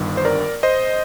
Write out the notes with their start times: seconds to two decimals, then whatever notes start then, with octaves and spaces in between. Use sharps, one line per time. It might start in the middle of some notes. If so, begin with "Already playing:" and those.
Already playing: G1 G2 D#3
0.17 C5
0.25 A#4 D5
0.63 C5 D#5